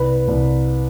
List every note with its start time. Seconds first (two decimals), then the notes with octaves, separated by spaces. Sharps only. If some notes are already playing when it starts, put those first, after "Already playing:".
Already playing: C2 B4
0.28 C2